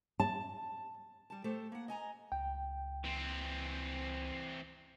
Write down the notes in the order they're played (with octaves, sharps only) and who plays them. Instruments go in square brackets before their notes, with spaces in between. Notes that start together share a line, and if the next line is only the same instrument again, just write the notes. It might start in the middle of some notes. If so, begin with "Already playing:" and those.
[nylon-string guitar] A5
[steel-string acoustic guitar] G3 A5
A3 G4 A4 C5
A#3 F#5
D#5 G#5 A#5
[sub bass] C#2 [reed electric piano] G5
[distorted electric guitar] E3 C4